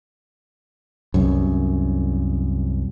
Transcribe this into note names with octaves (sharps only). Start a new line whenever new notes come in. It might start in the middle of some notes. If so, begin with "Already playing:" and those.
C2 F#2